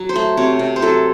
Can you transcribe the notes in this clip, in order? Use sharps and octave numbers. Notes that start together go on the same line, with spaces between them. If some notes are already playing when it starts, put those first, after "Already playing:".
Already playing: F#3 F#4
C5
A3
C3 C#5
C3
C5
F#3 A4